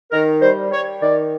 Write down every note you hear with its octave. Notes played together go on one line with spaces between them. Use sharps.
D#3 A#4
G3 C5
G3 C#5
D#3 D5